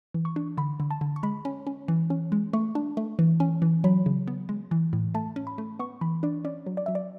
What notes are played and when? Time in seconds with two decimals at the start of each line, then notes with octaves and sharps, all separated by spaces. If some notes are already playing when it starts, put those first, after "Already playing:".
0.14 E3
0.25 C#6
0.36 D4
0.57 D3 B5
0.80 D3
0.91 A5
1.01 D3
1.16 C#6
1.23 G#3 B5
1.45 C#4
1.67 C#4
1.88 E3
2.10 C#4
2.32 G#3
2.53 A3 C#6
2.75 D4
2.97 A3
3.19 E3
3.40 C#4
3.62 E3
3.84 F#3 B5
4.06 C#3
4.28 B3
4.49 G#3
4.71 E3
4.93 A2
5.14 A3 A5
5.36 C#4
5.47 B5
5.58 A3
5.79 B3 C#6
6.01 E3 B5
6.23 D4 D5
6.45 C#4 D5
6.66 F#3
6.77 D5
6.86 F#3 E5
6.95 D5